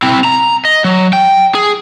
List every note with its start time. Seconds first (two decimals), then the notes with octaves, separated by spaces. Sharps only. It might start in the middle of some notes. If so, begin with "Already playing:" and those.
0.03 C4 E4
0.24 A#5
0.65 D#5
0.84 F#3
1.13 G5
1.55 G#4